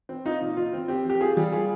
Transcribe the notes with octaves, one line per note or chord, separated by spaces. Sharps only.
C4
D#4 F4
A#2
A#2 F4
C4
C4 G4
F3 G4
F4 G#4
G3
F4 G#4